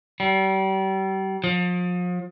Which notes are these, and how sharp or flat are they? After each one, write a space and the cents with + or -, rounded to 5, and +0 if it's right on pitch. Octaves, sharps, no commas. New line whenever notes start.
G3 -35
F3 +35